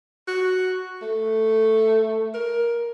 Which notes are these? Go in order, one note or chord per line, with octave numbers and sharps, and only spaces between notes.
F#4
A3
A#4